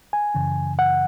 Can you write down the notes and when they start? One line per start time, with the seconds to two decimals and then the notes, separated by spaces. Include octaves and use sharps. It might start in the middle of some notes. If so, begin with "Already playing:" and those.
0.13 G#5
0.34 F#2 C#3 E3
0.79 F#5